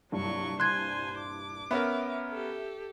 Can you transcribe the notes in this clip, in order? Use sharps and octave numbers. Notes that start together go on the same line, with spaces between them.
C2 G2 A#2 F#3 C#6
C5 G#5 C6 F#6 G#6
D6
B3 C#4 A#4 E5
G4 A4